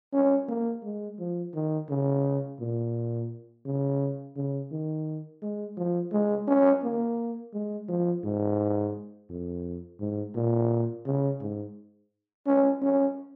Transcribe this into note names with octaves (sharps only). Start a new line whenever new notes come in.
C#4
A#3
G#3
F3
D#3
C#3
A#2
C#3
C#3
D#3
G#3
F3
G#3
C#4
A#3
G#3
F3
G#2
F2
G#2
A#2
C#3
G#2
C#4
C#4